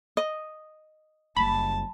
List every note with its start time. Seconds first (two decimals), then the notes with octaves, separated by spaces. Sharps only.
0.17 D#5
1.36 F#1 G3 A5 B5